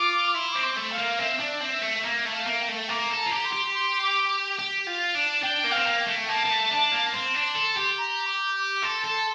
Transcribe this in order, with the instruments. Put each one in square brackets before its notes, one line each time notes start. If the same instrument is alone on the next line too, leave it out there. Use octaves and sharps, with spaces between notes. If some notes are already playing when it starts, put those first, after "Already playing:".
Already playing: [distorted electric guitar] F4 [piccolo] D6
[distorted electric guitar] E4 [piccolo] C6
[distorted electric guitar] C4 [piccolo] D6
[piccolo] C6
[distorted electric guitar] A3
[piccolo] F5
[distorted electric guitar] A#3
[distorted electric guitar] C4 [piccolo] E5
[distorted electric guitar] D4
C4
A3
[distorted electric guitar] A#3 [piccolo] E5
[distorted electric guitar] A3
[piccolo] F5
[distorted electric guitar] A#3
[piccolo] G5
[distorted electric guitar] A3
[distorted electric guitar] A#3 [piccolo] A#5
[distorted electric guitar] A4
[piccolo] A#5
[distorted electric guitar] F4
G4
[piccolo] C6
[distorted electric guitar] G4
[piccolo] C6
D6
[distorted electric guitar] G4
F4
D4
[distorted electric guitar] D4 [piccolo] G5
[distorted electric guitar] A#3
[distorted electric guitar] C4 [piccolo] F5
[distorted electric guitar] A#3
[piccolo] G5
[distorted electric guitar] A3
[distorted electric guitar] A#3 [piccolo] A5
[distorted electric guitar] A#3
A3
D4
A#3
[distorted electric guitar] C4 [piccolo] C6
[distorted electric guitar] D4
A4
G4
[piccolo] A#5
D6
D6
[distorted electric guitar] A4 [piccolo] C6
[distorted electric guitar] A4